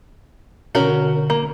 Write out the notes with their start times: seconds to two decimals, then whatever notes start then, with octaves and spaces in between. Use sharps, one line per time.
0.75 B2 D3 C#4 F#4 A#4
1.30 A#3